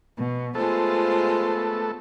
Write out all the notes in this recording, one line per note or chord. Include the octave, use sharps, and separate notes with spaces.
B2
G#3 A3 B3 F4 A4 C5